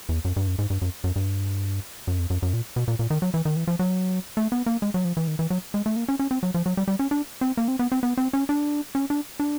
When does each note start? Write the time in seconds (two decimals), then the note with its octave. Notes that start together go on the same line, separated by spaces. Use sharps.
0.09 E2
0.25 F#2
0.36 G2
0.47 F#2
0.59 G#2
0.70 G2
0.82 F#2
1.04 F#2
1.16 G2
2.07 F#2
2.18 F2
2.30 F#2
2.42 F#2
2.53 A#2
2.76 B2
2.88 A#2
2.99 A#2
3.10 D#3
3.22 F#3
3.34 E3
3.45 D#3
3.56 E3
3.67 F3
3.79 F#3
4.37 A3
4.52 B3
4.66 A#3
4.82 G#3
4.94 F#3
5.05 F3
5.17 E3
5.28 D#3
5.39 E3
5.50 F#3
5.74 G#3
5.86 A3
5.96 A#3
6.08 C#4
6.19 C#4
6.31 C4
6.43 F#3
6.54 F3
6.66 F#3
6.77 G3
6.88 G3
6.99 C#4
7.11 D4
7.41 C4
7.57 A#3
7.68 C4
7.79 B3
7.92 C4
8.03 B3
8.18 C4
8.33 C#4
8.49 D4
8.95 C#4
9.10 D4
9.40 D4